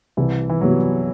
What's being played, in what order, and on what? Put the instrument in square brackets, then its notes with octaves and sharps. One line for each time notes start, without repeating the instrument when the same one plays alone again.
[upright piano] C2 [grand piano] E3
[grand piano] E3
[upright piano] C3 G3 B3 F#4 [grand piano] F#3